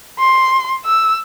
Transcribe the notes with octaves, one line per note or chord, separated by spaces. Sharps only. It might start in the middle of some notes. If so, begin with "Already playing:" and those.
C6
E6